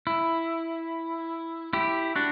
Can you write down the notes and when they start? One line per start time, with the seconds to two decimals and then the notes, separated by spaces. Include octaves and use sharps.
0.07 E4
1.73 E4 G4
2.16 D4 F#4